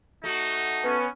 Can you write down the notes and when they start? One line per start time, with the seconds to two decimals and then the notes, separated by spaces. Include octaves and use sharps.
0.24 A3 D#4 F#4
0.84 B3 C#4